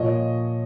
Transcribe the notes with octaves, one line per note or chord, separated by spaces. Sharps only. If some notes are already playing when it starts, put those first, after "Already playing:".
Already playing: A#2 F3 C#5 D#5